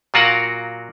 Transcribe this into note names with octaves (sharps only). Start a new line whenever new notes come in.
A#2 F#3 F4 F#4 A#4 F#5